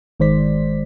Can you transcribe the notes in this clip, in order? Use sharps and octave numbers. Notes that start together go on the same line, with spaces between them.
G1 D#3 G#3 C5 D5 B6